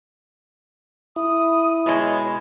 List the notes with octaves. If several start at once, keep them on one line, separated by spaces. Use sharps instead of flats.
E4 D#6
B2 G#3 C#5